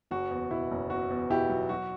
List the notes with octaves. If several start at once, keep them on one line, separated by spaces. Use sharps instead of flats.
F#1 F#4
E2
B2 E4
F#1
B2 F#4
E2
B2 E4 G4
F#3
F#3 F#4